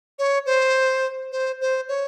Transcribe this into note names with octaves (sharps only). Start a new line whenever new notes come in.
C#5
C5
C5
C5
C#5